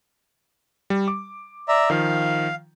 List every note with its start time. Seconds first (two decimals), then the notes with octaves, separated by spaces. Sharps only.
0.90 G3
1.08 D6
1.68 D5 E5 A#5
1.90 D#3 F3 F5